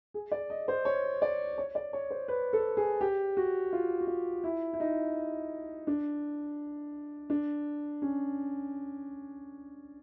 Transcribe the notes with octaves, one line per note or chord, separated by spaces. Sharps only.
G#4
D5
D#5
C5
C#5
D5
C#5
D5
C#5
C5
B4
A4
G#4
G4
F#4
F4
F#4
F4
E4
E4
D#4
D4
D4
C#4